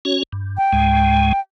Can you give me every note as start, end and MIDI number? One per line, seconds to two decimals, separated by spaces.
0.05 0.23 61
0.05 0.23 66
0.05 0.23 73
0.33 0.58 43
0.57 1.40 79
0.73 1.33 37
0.73 1.33 44
0.73 1.33 56